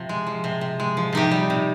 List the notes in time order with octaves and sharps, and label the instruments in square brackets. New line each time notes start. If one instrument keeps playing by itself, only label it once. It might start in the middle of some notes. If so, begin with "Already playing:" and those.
Already playing: [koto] C3 F3
G#3
F3
C3
C3
G#3
F3
C3 D#4 G4
G3
C3